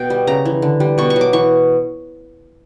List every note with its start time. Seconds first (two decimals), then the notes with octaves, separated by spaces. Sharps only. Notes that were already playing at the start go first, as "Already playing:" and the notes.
Already playing: B2 G5
0.10 G3
0.27 C#3 A#5
0.45 E3
0.62 D3
0.80 G3
0.98 B2 C#6
1.10 C#6
1.16 F#3
1.21 D6
1.33 E3 C#6